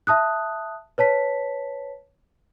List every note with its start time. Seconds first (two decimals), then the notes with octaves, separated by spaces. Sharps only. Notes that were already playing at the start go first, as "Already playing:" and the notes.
0.07 E5 A5 D#6 F#6
0.98 B4 C#5 A5 B6